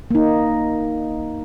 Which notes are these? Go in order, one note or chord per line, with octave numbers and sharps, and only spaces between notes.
A#3 D#4